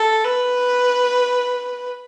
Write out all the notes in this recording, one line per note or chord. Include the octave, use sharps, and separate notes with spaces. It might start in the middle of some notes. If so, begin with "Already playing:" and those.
Already playing: A4
B4